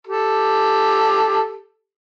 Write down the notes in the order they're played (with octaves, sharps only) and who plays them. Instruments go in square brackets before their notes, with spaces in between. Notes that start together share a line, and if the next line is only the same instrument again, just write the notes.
[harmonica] G4 A4